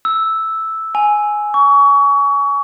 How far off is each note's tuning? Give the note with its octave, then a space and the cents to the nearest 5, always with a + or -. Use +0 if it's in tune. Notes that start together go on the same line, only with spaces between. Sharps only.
E6 -5
G#5 +5
C#6 +30